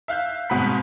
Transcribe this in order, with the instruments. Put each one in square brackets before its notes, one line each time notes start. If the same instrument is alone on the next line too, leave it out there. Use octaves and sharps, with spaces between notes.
[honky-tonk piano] E5 F5 F#6 G6
C2 G#2 B2 F#5 B5 B6